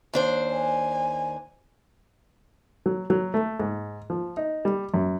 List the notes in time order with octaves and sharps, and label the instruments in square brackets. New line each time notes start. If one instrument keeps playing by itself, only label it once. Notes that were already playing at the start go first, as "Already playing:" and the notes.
[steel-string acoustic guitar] D#2 D4 C5
[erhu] G#5
[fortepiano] F#3
F#3
A3
G#2
F3
D#4
G3
F#2